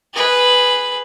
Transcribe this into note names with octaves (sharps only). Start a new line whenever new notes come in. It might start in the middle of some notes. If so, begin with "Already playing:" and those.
G#4 B4